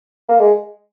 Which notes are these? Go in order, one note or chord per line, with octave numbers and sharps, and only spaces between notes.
A#3
G#3